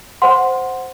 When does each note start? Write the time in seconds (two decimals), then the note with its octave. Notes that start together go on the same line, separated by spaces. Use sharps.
0.22 C5 F#5 C6